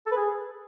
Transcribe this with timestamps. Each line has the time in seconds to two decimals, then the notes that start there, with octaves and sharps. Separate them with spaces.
0.06 A4
0.11 B4
0.17 G#4